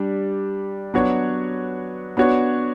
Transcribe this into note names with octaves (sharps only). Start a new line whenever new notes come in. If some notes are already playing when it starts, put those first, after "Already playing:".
Already playing: G3 D4 G4 D5
F#3 B3 D4 F#4 C#5
B3 D4 F#4 C#5